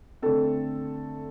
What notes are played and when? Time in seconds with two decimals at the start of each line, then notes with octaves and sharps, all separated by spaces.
0.22 D3 A3 C4 A4